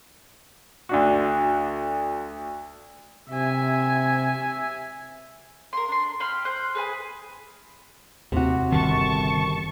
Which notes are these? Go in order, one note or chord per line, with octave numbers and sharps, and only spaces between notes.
D2 D4 F#4
C3 E5 G#5
A#4 C6
D4 C6
G5 B5 C6 F6
C5 F#6
G#4 B4 G#5
D#2 C3 F#4
G1 D#3 A5 C#6